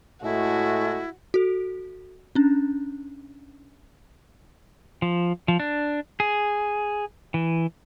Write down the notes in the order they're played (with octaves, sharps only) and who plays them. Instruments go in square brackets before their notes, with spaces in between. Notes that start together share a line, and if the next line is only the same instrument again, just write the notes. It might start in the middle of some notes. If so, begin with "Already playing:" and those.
[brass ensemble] A2 G#3 A3 [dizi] E4 [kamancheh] F#4
[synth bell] F#4 A4
C#4 D4
[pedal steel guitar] F3
F3
D4
G#4
E3